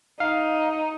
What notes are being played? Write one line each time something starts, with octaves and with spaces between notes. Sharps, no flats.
D#4 F5